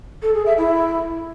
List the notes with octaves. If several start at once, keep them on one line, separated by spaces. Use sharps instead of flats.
A4
G#4
E5
E4